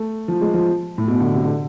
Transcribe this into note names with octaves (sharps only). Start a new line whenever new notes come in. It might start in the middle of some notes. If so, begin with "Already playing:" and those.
Already playing: A3
F3
G#3
F3
A2
B2
D3
C3
D3